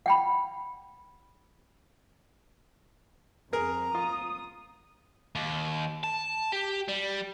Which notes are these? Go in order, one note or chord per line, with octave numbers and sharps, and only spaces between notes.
F#5 G5 B5
F2 G#4 A#4 A#5
F4 D#6
D#2
A5
G4
G3